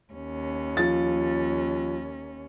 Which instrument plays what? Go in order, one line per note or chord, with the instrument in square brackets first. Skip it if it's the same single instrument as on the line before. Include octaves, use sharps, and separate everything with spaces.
[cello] D#2 C#4
[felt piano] F3 A6